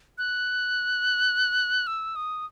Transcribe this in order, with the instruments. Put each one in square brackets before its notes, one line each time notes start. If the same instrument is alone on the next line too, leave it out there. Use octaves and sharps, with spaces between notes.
[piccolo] F#6
E6
D#6